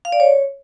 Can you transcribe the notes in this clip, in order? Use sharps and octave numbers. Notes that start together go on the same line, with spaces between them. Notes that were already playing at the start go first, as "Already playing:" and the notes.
F5
D5
C#5